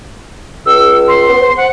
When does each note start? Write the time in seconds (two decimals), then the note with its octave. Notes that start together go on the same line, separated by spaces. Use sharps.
0.66 C#2 E6
1.08 C6
1.29 B3
1.40 C5
1.57 F#5